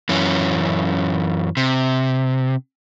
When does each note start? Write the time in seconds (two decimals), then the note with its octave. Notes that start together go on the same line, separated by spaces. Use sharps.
0.09 F#2 E3 C#4
1.57 C3